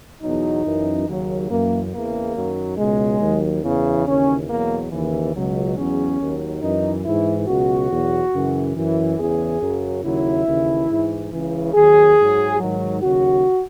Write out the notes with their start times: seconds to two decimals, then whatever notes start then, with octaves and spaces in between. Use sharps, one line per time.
0.22 E2 B2 F#3 D#4
0.65 F#2 E3
1.07 D#2 C#3 F#3
1.50 F#2 E3 A#3
1.93 E2 C#3 E3 A#3
2.35 F#2 D#3 F#3
2.78 C#2 B2 F#3 G#3
3.21 D#2 D#3 F#3
3.63 E2 C#3 E3
4.06 D#2 C#3 E3 C#4
4.49 E2 B2 F#3 A#3
4.91 D#2 C#3 E3
5.34 C#2 B2 F#3
5.77 E2 C#3 F#3 C#4
6.19 D#2 D#3 F#3
6.62 F#2 E3 D#4
7.05 G#2 E3 E4
7.48 C#2 B2 F#3 F#4
7.90 E2 B2 F#3
8.33 F#2 C#3 E3
8.76 F#2 E3
9.18 E2 C#3 E3 G#4
9.61 F#2 C#3 F#3
10.04 D#2 C#3 F#3 E4
10.46 D#2 C#3 E3
10.89 G#2 E3
11.32 C#2 C#3 E3
11.74 D#2 D#3 F#3 G#4
12.17 G#2 F#3
12.60 G#2 D#3 F#3
13.02 D#2 C#3 F#3 F#4